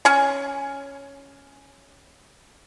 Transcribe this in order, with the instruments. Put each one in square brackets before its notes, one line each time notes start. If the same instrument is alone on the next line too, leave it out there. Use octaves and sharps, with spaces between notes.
[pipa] C#4 G#5